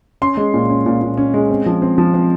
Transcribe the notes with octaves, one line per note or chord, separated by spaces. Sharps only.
C#4 C6
G#3
A#2
C#4
A#2
A#2
C#4
G#3
C4
F3
C4
F3
C4